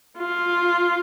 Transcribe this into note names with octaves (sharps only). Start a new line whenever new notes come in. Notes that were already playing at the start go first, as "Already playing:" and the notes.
F4